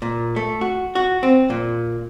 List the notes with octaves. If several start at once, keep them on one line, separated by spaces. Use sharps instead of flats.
A#2
A3
F#4
F#4
C4
A#2